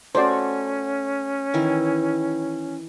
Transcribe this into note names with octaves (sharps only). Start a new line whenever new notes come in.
A3 C#4 F#4 C5 D5
D#3 E3 E4